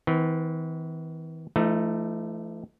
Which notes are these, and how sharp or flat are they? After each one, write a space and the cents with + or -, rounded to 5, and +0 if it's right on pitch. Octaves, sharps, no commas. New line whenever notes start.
E3 -40 B3 +45
E3 +45 A3 +0 D#4 +0